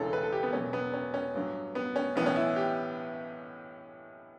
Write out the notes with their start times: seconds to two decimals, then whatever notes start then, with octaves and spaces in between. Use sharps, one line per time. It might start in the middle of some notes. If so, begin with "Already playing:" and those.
Already playing: E1 D2 C#3 E3 C#4 A4
0.13 B4
0.23 A4
0.32 G4
0.43 B3
0.53 E1 E2 B2 F#3 C#4
0.73 B3
0.94 C#4
1.14 C#4
1.34 A1 G2 F#3
1.75 B3
1.96 C#4
2.16 B1 A2 E3 B3
2.26 C#4
2.36 E4
2.56 G4